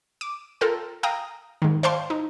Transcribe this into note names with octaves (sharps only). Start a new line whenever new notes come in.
D6
F4 A4 A#4 G5
F5 G5 A#5 D#6
G#2 D#3
C5 D5 F5 G5 A5 C6
D#4